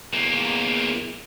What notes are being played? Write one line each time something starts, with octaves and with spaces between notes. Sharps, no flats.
E2 A#3